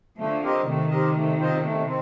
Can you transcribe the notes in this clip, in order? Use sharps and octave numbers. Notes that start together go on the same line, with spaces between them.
D3 F3 A3
C4 G4 A#4 D#5
C3 D#3 A3
C4 G4 A#4 D#5
A3
C4 F4 C5 D#5
A3
C4